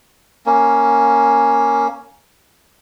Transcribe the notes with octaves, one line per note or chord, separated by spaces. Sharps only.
A#3 C#4